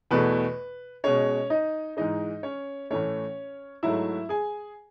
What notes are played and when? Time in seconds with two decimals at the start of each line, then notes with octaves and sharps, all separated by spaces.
0.11 E2 B2 A3 B4
1.04 B2 G#3 C#4 C#5
1.50 D#4 D#5
1.97 G#2 E3 G#3 D#4 D#5
2.43 C#4 C#5
2.90 A2 E3 A3 C#4 C#5
3.83 G#2 F#3 A3 E4 E5
4.29 G#4 G#5